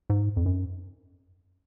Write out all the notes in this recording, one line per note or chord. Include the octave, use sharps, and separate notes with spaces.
G#2
F2
F#2